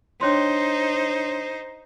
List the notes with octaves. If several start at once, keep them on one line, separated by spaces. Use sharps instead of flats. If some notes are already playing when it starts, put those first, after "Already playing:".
D4 D#4 C5 C#5 C6